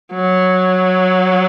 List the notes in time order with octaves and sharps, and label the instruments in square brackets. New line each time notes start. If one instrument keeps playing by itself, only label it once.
[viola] F#3